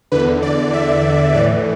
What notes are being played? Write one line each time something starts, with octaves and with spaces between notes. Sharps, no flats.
E2 D3 B4
D5
E5
A2 E3 D5